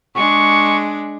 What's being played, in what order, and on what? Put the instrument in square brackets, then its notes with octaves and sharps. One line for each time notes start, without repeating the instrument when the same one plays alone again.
[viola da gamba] G#3 D4 [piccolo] C#6